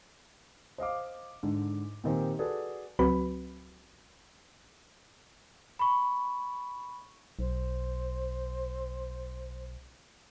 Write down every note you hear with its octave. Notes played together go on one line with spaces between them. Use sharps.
C5 D#5 F5 D6
G#2 D3
A#2 D#3 C4 G4
F#4 G#4 A4 B4 D5
C#2 F#3 C4 F#4 B4 B5
B5 C#6
B1 C5